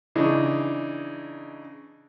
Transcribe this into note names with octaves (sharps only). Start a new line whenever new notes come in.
C#3 E3 D4 D#4